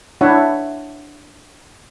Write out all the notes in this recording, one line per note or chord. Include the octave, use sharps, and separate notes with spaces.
D4 E4 C#5 E5 F#5